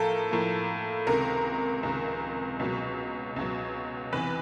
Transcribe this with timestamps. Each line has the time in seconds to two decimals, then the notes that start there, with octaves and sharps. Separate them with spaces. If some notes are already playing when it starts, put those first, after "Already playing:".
Already playing: A2 F3 A#3 A4 A#4
0.31 A2 F3 A#3
1.07 C#2 C3 D#3 A#4
1.83 C#2 C3 D#3
2.59 C#2 B2 F#3
3.36 C#2 B2 F#3
4.12 E2 C3 E3 B4